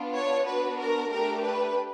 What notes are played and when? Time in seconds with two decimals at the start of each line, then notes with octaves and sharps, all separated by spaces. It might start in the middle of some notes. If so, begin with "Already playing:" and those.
Already playing: B3 D4 F4
0.14 C#5
0.46 B3 D4 F#4 B4
0.78 A#4
1.11 A3 D4 G4 A#4
1.43 B4